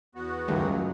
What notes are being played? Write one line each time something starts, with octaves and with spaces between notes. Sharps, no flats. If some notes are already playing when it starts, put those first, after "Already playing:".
E2 B3 F#4
C#2 F#2 D#3 F#3 G3 A3